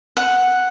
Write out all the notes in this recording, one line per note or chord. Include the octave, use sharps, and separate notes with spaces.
F#5